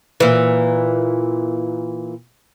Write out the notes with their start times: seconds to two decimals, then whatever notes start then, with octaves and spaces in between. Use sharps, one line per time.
0.20 A#2 E3